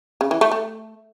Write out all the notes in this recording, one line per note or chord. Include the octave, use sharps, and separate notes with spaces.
C#3
E3
A3
A3